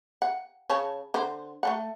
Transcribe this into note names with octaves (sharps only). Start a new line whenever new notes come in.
F#5
C#3 C#5 A5
D3 C5
A3 A4 F#5